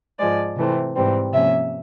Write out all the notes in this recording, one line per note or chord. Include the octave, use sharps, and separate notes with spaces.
G#2 F3 G#3 D5
C3 E3 A3 C4
G#2 E3 G3 C4
C3 F3 A#3 C#4 E5